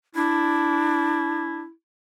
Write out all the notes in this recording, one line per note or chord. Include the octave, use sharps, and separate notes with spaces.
D4 E4